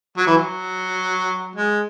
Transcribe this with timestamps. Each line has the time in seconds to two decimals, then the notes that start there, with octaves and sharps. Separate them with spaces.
0.17 F#3
0.27 E3
0.37 F#3
1.55 G#3